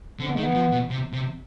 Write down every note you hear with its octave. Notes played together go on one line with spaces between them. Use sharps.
D3 C4
B3
D#3 G#3
B3
F3
B2
C3
C3